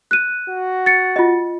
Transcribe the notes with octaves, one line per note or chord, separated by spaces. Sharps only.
F#6 D#7
F#4
A6 C#7
F4 D#5